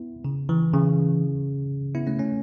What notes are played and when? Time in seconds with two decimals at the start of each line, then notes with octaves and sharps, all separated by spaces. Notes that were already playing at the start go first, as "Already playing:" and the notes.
Already playing: B3 E4
0.25 C#3
0.49 E3
0.73 C#3
1.95 B3 E4
2.07 A3 C#4
2.18 A3 C#4